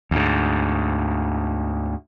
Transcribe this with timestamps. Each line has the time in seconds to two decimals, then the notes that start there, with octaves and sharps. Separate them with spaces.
0.11 D2 G#2